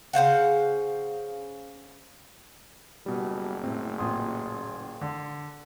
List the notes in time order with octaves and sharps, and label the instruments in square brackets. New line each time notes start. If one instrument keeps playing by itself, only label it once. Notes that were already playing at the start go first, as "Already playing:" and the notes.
[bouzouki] C#3 C5 F5 F#5
[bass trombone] F#1 [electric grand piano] B2 G3
[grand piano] A2 [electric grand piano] C4
[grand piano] A1 A#2 [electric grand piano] C6 D#6
[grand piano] D3